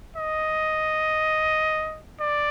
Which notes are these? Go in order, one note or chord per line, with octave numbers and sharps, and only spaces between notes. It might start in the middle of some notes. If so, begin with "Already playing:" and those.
D#5
D5